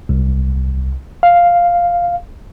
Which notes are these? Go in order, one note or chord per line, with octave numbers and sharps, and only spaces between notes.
C2
F5